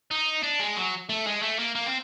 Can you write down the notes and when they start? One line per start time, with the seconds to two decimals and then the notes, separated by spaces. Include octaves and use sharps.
0.11 D#4
0.43 D4
0.60 G#3
0.77 F#3
1.09 A3
1.27 G#3
1.42 A3
1.59 A#3
1.75 A#3
1.86 C4